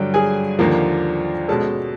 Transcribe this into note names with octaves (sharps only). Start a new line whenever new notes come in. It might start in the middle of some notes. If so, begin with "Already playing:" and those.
Already playing: G2 D3 F#3 G4 G5
G#4 G#5
D#2 D3 F3 A#3
B2 G#3 C#4 A4 A5